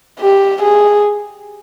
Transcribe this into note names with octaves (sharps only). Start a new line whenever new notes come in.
G4
G#4